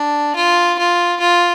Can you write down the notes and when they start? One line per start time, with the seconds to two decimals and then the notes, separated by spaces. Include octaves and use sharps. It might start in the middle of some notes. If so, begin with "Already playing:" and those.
Already playing: D4
0.36 F4
0.79 F4
1.20 F4